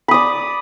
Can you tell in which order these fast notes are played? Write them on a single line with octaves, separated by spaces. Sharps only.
B5 D#6 D5